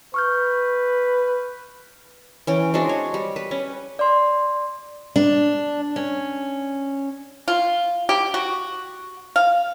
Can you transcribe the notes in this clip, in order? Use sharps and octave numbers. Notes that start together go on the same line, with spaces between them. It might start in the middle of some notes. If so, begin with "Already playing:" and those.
B4 C#6 F6 G6
E3 C#4 G5
G#3 C4 D4 F#4
C#5
G3
B4
C#4
D5 C6
D4
C#4
F4
G4
F#4
F5